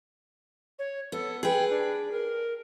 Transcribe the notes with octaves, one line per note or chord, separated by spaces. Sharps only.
C#5
B3 A4
G#4 B4 G5
D4
A#4